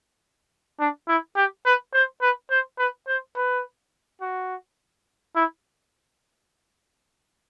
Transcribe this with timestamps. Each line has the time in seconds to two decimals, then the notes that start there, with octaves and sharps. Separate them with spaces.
0.79 D4
1.08 E4
1.36 G4
1.66 B4
1.94 C5
2.22 B4
2.50 C5
2.78 B4
3.08 C5
3.36 B4
4.21 F#4
5.36 E4